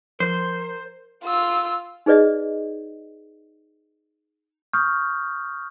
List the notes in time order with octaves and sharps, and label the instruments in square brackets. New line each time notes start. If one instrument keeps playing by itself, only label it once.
[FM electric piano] F3 [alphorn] A#4 [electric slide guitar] C5
[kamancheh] F4 E6
[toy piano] D#4 G#4 B4 D5 D#5
[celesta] C#6 D#6 F6 G6